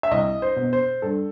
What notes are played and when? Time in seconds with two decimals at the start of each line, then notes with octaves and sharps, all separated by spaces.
0.03 E5
0.11 C2 D#5
0.42 C5
0.56 B2
0.73 C5
1.02 G2 A4